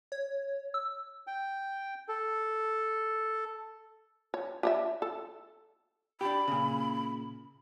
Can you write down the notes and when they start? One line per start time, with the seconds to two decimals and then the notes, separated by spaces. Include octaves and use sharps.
0.12 C#5
0.74 E6
1.27 G5
2.09 A4
4.34 C#5
4.63 G4 C#5 E5
5.02 A4
6.21 D4 G4 B5
6.48 A#2 C#3